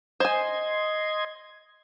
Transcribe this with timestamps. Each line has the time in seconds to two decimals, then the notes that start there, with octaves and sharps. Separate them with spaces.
0.20 C5 D#5 G#5 C6 G#6